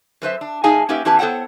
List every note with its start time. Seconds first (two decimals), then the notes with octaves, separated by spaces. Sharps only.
0.22 F#2 B4 C5 E5
0.41 D4
0.64 A2 D#4 G#4 F5 G#5 A5
0.89 A#3 C#4 D#4 G4 B4 E5
1.05 E2 C#4 E4 G4 B4 A5
1.19 B3 A4 C5 C#5 F#5 G5